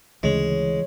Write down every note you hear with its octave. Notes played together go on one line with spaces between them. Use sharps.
D2 C#3 E3 G#3 C#5